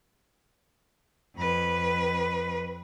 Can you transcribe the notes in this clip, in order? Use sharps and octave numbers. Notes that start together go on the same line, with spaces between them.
F2 B4